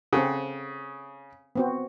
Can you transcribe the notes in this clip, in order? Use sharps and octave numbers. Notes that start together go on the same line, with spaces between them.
C#3 C4 A4 F#5
B3 C4 F#4